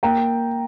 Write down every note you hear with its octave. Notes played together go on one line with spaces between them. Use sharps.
A#3 G5 A#5